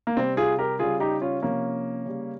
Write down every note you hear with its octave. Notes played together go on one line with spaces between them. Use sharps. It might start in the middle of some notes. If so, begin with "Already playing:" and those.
A#3
C3 G3 C4
F4 G#4
G4 A#4
C#3 G3 F4 G#4
D#4 G4
C#4 F4
C3 F3 A#3 C#4
C#3 G3